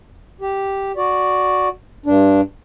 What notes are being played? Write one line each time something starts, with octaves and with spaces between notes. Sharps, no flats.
G4
F#4 D5
G2 D4